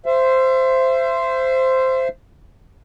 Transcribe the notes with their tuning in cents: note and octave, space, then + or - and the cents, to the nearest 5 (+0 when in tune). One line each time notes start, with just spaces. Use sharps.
C5 -5 E5 +30